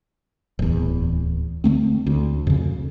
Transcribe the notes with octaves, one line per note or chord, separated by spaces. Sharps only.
D1 E2
D3 F3 A3 C4
D2
F2 C#3